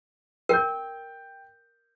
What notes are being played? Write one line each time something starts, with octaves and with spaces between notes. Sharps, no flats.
A#4 G5 G6